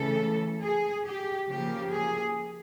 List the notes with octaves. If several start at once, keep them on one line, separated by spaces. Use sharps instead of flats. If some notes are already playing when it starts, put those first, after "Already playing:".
Already playing: C#3 E3 A3 A4
G#4
G4
C#3 F3 A#3 G4
G#4